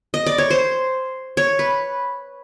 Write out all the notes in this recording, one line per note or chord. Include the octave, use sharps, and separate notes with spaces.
D#5
D5
C#5
C5
C#5
B4